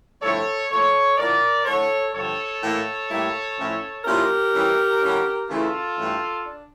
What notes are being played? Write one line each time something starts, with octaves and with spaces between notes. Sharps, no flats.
G2 D3 F3 A3 E4 A4 C#5
A#2 F3 A3 A4 C#5
D3 F3 A#3 E4 A#4 D5
D3 A3 E4 A4 C#5
G2 D3 F3 A4 C#5
A2 E3 A#3
A2 G3 A#3 E4
A2 F3 C#4 E4
A#2 F3 C#4 E4 G4 A#4
E3 G3 C#4 E4
D3 G3 C#4 E4
C#3 E3 A3 E4 F4 A4
G2 E3 A3 C#4
D4